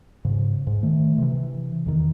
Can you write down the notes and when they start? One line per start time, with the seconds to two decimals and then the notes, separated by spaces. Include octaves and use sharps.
0.25 G#2 C#3
0.67 G#2
0.83 D#3 A3
1.18 C3 E3
1.86 E2 D#3